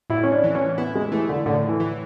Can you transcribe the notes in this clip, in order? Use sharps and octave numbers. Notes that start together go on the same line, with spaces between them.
A2 E4
C#4
D4
E3
C#4
B3 E4
G#3
E3 A3
D3
A2 D3
E3
E3